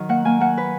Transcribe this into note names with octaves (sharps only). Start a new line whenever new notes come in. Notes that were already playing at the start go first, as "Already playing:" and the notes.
Already playing: D#3 F#3
A#3 F#5
A#3 G#5
A#3 F#5
B4